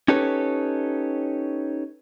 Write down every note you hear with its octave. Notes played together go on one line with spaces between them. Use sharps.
C#4 D#4 G4 A4 B4 C#5